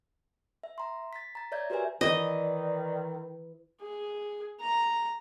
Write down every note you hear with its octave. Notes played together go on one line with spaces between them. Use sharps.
E5
A#5 C6
A6 B6
A#5 A6
C#5 D5 E5 A#5 G6 G#6
F#4 G4 A#4 B4 E5 G#5
D#3 E3 D5 D#5
G#4
A#5